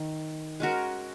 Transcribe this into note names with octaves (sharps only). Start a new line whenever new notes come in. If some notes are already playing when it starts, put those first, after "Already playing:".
Already playing: D#3
G#3 C#4 F#4 A#4